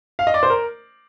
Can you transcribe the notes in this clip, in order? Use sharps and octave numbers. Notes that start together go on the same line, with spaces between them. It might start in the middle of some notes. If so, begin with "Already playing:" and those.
F5
D#5
D5
C5
A#4